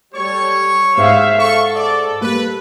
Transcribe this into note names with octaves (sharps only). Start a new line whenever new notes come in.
G3 A4 C#5 C#6
G#2 C5 E5 F5
A4 C#6
D5
G3 A#3 B4